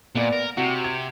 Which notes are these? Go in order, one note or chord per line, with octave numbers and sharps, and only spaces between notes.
A#2 B3 D5
A#4
C3 F#4
G#6